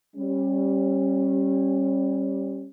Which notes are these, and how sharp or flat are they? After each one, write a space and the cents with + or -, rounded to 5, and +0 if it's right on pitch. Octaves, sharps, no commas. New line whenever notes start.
G3 +0 C#4 -30